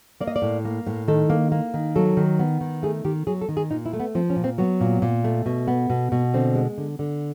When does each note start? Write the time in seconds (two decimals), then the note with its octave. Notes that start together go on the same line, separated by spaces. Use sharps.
0.21 A#3 D5
0.27 D#5
0.36 D5
0.42 A2
0.65 A#3
0.87 A2
1.08 D#3 A4
1.30 A#3
1.52 A#3
1.74 D#3
1.96 F#3 A4
2.17 D#3
2.39 B3
2.61 D#3
2.83 A3 G#4
3.05 D#3 G4
3.27 F#3 G#4
3.41 A4
3.49 D#3
3.57 G#4
3.71 A#2 D#4
3.86 E4
3.93 A3
4.00 B3
4.15 F3 C4
4.30 C#4
4.36 A#2
4.44 C4
4.58 F#3 B3
4.81 A#2
5.02 A#2
5.24 A3
5.46 B2
5.68 B3
5.90 B2
6.12 B2
6.34 D3 C4
6.55 G#3
6.78 D3
6.99 D3